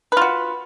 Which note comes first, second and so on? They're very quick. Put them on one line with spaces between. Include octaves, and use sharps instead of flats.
B4 F4 F#4